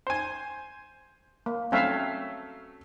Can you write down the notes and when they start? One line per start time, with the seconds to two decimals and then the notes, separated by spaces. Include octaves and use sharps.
0.07 C5 G#5
1.46 A#3
1.72 F#3 A3 C4 C#4 E5 F5